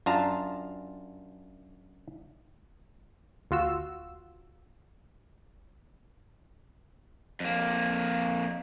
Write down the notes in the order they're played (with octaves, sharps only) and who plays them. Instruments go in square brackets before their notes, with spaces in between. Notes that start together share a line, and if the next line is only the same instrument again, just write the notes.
[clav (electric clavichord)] F#2 D4 F4 A5 A#5
[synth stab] D2 F4 F#4 E6
[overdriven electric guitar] F2 A#3